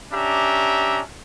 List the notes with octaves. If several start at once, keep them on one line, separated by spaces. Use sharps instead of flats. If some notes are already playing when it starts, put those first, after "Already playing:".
C#4 D4 G4 E5 A#5